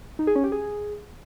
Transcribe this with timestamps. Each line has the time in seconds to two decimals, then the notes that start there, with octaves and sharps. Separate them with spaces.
0.19 D#4
0.27 G#4
0.36 C#4
0.44 G4
0.52 G#4